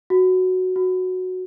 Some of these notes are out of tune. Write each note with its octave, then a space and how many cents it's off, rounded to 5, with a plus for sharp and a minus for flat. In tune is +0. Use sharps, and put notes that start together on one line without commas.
F#4 +0
F#4 -5